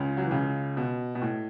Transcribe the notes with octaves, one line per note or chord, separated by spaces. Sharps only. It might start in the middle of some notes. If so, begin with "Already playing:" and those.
Already playing: C#2 C#3
F#3
E3
C#2 C#3
B2
B2
A2